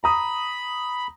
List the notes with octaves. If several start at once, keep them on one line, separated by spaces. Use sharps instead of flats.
A#5 B5 D#6